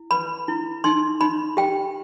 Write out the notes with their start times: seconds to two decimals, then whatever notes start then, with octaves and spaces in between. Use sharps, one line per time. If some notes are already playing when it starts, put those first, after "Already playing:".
Already playing: E4
0.11 B4 B5
0.48 E4
0.84 D#4 C6
1.21 D#4 B5
1.57 G4 G5